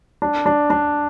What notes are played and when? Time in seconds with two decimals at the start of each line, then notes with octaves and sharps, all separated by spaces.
0.22 D4
0.46 D4
0.70 D4